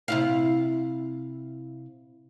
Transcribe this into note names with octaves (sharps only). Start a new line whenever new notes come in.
C3 E4 F5